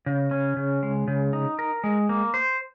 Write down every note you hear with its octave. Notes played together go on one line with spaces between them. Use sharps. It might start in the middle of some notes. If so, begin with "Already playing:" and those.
C#3
C#4
C#3
G#3
C#3
D#4
A#4
G#3
A#3
C5